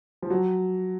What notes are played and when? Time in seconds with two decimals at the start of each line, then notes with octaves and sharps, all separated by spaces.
0.22 F3
0.30 F#3